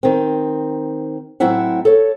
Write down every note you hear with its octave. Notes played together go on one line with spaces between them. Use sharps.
D#3 C4
A2 F#3 C4 E4 E5 F#5
A4 C#5